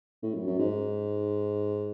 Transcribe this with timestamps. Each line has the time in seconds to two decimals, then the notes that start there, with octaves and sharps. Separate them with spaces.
0.23 A2
0.35 F#2
0.47 F#2
0.58 G#2